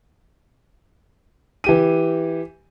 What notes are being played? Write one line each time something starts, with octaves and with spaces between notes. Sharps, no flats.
E3 G4 D#7